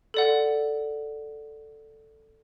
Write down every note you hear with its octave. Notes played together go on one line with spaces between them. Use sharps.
A4 D5 F#5